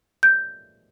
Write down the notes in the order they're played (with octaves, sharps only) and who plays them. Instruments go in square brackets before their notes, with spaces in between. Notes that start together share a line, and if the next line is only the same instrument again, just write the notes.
[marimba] G6